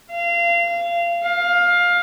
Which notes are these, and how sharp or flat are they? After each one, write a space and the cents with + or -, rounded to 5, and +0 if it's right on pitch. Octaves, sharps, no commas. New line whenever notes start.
F5 -25
F5 +15